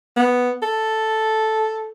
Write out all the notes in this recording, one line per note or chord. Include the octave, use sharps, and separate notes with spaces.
B3
A4